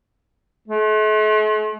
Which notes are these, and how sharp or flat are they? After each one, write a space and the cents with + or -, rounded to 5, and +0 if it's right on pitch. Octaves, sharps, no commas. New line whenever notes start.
A3 -45